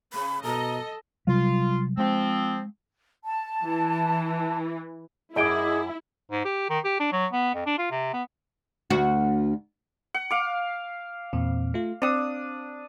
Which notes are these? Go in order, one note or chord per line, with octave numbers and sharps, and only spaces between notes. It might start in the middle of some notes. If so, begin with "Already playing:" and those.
C#3 B5
B2 A4 D#5 A#5
C3 F#3 G3 F4
F3 G#3 C4
A5
E3
F#2 E4 G#4 D#5 G5 D6
G#2
G4
D#3
G4
D4
F#3
B3
F2
D4
F4
C3
B3
D2 F#4
F#5
F5 D6
E2 A#2 C4
A3 F4
C4 D4 D#6